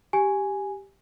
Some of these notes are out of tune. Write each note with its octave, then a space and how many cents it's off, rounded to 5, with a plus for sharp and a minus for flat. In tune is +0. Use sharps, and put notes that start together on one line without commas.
G4 +0 G#5 +0